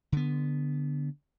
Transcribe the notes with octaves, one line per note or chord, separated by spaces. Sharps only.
D3 B3